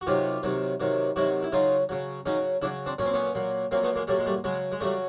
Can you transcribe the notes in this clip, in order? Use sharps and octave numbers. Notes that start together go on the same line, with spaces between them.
F#4
C3 D#3 F#3 F4 G4
C3 D#3 F#3
C3 D#3 F#3
C3 D#3 F#3 E4 F#4
E4
C#3 F#3 D#4 F4
C#3 F#3
C#3 F#3 C#4 D#4
C#3 F#3 D4 E4
C4 D4
A#2 F#3 C#4
C4
B3 C#4
A#2 F#3
A#2 F#3 A#3 C4
A3 B3
G#3 A#3
A#2 F#3 G3 A3
G#3
G3 A3
C#3 F#3 G#3
G#3
C#3 F#3 G3 A3